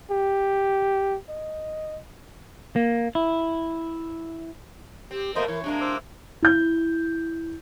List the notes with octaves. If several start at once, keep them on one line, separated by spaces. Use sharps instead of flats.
G4
D#5
A#3
E4
C4 G4
B2 A3 A#3 A#4 C5 D#5
E3 C#5 C#6
C3 G#3 A#3 D4
C5 D6 E6
E4 G6